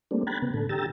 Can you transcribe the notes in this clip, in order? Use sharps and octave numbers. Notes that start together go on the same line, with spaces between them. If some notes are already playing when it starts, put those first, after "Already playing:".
G3 A3 A#3 C4 D4
G5 A#5 B5 F#6 G#6 A6
C#3 B3
A2 D3 A4
D3 G4 G5 A#5 E6 A6